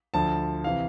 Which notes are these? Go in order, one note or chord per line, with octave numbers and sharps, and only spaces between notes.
D2 D3 F3 A5
C3 E3 F5